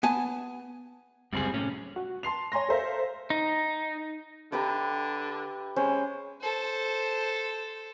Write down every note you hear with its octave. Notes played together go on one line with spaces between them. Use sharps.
B3 G#5 A5
F#1 C#2 F#2 G3 C4 G#4
A2 C3 F#3 C#4
F#4
A5 C6 C7 F7
C#5 G#5 A#5 C6 A#6
A4 A#4 C5 E5 F5
D#4
D3 G4 B4 E5 A#5 D6
G#3 C#4 C5
A4 C5